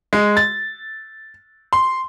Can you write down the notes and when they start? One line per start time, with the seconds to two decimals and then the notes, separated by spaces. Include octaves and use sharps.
0.13 G#3
0.37 A6
1.73 C6